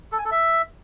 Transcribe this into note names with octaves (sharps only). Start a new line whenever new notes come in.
A4
G#5
A4
E5